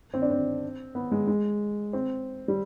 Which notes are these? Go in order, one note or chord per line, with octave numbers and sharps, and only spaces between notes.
C4
D4
C4
B3
G#3
G#3
C4
G3